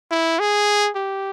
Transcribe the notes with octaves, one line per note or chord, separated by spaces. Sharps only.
E4
G#4
G4